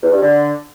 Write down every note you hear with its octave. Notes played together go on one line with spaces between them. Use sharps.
E2
G2
D3